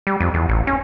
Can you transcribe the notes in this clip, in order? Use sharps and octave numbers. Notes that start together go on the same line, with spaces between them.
G3
F2
E2
A1
C#4